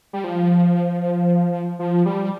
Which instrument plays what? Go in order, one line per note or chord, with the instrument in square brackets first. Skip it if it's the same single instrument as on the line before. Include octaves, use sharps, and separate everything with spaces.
[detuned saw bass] G3
F3
F3
G3